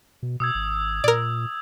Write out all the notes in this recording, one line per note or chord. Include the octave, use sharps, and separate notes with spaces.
B2
B2 D#6 E6 G#6
G#1
A#2 A#4 D5